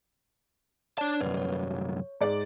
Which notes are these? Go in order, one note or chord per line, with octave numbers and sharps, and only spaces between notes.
D4 C#5 D5 A5
C2 F#2 B4
C#5
G#2 D5